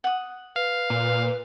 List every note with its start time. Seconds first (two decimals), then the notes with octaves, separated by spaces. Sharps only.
0.04 F#5 D#6
0.56 B4 F5
0.90 A#2